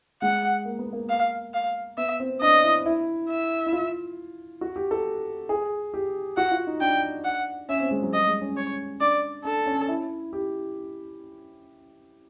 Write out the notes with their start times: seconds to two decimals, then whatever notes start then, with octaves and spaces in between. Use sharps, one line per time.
0.22 G#3 F#5
0.65 A#3
0.79 B3
0.93 A#3
1.09 F5
1.54 F5
1.97 B3 E5
2.20 C4
2.41 D4 D#5
2.63 E4
2.86 E4
3.30 E5
3.66 E4
3.73 F4
4.61 F#4
4.76 G4
4.91 A4
5.49 G#4
5.94 G4
6.37 F#4 F#5
6.51 F4
6.67 D#4
6.81 D4 G5
7.24 F#5
7.69 C#4 E5
7.80 C4
7.91 G#3
8.02 F#3
8.12 G3 D#5
8.27 G#3
8.42 C#4
8.57 C#5
9.01 D4 D5
9.45 D4 A4
9.66 C#4
9.88 E4
10.33 G4